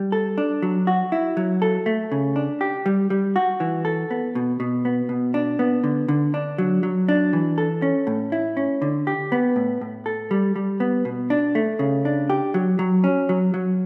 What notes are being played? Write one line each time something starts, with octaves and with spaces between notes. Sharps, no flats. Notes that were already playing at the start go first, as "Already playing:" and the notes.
Already playing: G3
A4
D4
F#3
F#4
E4
F#3
A4
A3
C#3
D4
G4
G3
G3
F#4
E3
A4
B3
B2
B2
B3
B2
D4
B3
D3
D3
D4
F#3
F#3
D4
E3
A4
C#4
A2
E4
C#4
D3
G4
B3
A2
A2
A4
G3
G3
B3
B2
D4
A3
C#3
D4
G4
F#3
F#3
C#4
F#3
F#3